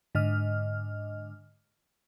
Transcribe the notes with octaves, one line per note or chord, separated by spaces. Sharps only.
G#2 D3 D#5 F6